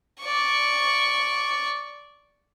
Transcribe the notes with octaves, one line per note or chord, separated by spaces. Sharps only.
D5 C#6